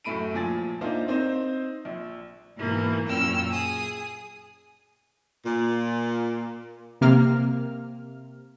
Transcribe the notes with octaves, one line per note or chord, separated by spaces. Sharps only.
F#2 A2 A3 B5 D7 D#7
A#2 F3 G#5 A6
A#3 D4 D#4 F4 C5 E5
C4 D#4 C5
A#1
G#2 B2 E3 A#3
F#2 A#2 C#4 G5 E6 F6
G#4 D#6
A#2
C3 A#3 F6